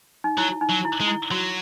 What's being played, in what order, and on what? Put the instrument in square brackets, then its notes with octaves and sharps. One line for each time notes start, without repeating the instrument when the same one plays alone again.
[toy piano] D#4
[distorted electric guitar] F#3 [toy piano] E4
[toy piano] D#4
[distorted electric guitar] F#3
[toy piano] E4
[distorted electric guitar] G#3
[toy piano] E4
[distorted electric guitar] F#3 [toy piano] F#4